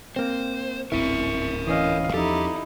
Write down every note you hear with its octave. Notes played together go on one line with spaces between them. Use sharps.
A#3 C4 C5
D1 G#1 C4 E4 A#4 E5 C#6
E3 C#4 D#5 F5
E2 F3 C#4 D#4 E4 G4 A4